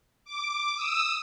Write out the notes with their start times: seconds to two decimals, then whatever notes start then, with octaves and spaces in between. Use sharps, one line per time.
0.25 D6
0.75 D#6 E6